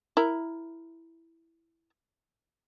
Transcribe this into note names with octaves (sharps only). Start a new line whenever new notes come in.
E4 A#4